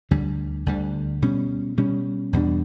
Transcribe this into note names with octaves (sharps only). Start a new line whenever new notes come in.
D2 D3 G3
D2 D3 G3
B2 G3 C#4
B2 G3 C#4
E2 B2 G3 D4